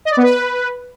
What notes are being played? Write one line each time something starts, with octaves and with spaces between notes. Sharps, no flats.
D#5
D5
B3
B4